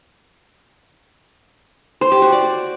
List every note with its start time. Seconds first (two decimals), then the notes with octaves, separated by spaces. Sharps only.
2.01 C5
2.12 G4
2.22 F#4
2.32 D5